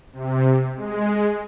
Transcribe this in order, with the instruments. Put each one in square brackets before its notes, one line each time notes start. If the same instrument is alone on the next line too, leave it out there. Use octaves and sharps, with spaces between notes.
[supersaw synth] C3
G#3